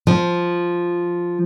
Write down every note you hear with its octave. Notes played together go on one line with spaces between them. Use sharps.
F3